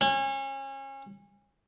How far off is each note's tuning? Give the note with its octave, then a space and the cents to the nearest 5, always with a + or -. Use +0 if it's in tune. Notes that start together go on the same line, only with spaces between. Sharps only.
C#4 -30